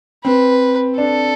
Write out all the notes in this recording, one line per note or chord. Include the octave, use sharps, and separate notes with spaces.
C4 B4
D4 A4